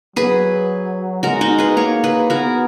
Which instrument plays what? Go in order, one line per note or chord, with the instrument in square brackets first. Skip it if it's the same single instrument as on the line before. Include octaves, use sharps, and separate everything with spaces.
[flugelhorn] F#3 [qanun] G#4 B4
[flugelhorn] G#3 [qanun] F#4 A#4
[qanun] D#4 F#4
G#4 B4
[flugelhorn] A#3 [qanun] A#4 C#5
[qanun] G#4 B4
[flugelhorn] B3 [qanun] F#4 A#4